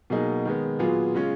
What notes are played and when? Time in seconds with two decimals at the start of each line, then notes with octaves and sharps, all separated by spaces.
0.10 B2 F#3 A#3 D#4 G#4
0.45 D#3 G#3 B3
0.79 A#2 F#3 B3 F4 G#4
1.14 C#3 G#3 C#4 F4